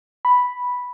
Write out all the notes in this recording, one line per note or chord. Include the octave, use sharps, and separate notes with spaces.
B5